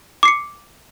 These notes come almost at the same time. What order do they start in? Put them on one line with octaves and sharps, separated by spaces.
D6 C7 C#7